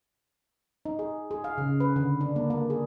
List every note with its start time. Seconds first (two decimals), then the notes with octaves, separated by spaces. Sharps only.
0.86 D#4
0.99 G#4
1.31 G#4
1.44 F5
1.58 C#3
1.80 B4
1.96 D3
2.21 D4
2.36 A#3
2.50 A#3
2.70 G#4